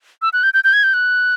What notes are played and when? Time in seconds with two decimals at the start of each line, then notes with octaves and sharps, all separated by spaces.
0.22 E6
0.33 F#6
0.43 G6
0.54 G6
0.64 G6
0.73 G#6
0.83 G6
0.94 F#6